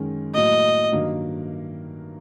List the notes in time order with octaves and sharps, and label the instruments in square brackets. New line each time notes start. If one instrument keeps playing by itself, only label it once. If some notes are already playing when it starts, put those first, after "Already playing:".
Already playing: [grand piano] F#2 D#3 G#3 C#4
[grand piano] A2 F#3 A#3 [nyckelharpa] D#5
[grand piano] G2 D#3 F#3 A#3